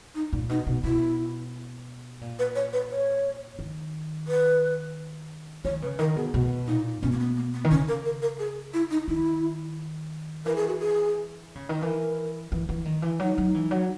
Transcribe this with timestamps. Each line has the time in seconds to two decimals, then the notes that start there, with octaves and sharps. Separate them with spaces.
0.15 D#4
0.33 A#2
0.49 B2 D#4
0.67 B2
0.84 B2 E4
2.21 A#2
2.39 B4
2.55 C#5
2.73 B4
2.90 C#5
3.59 D#3
4.28 B4
5.65 D#3 C#5
5.82 C#3 B4
5.99 D#3 A#4
6.16 B2 G#4
6.34 B2 F#4
6.67 A#2 D#4
7.02 B2 C#4
7.12 A#3
7.19 B3
7.36 A#3
7.54 B3
7.64 D#3
7.71 C#3 C#4
7.88 A#4
8.05 A#4
8.22 A#4
8.39 G#4
8.73 E4
8.91 D#4
9.08 D#3 E4
10.46 E3 A#4
10.56 G#4
10.68 F#4
10.79 G#4
11.55 C#3
11.69 D#3
11.82 E3 A#4
12.52 E3
12.69 E3
12.85 D#3
13.02 E3
13.19 F#3 D#4
13.38 F#3
13.54 E3
13.71 F#3